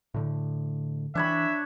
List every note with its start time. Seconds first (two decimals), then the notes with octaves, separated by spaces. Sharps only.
0.14 A2 D3
1.15 E3 D4 C#5 E5 B5